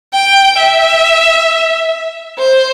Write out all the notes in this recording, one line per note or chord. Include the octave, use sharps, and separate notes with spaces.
G5
E5
C5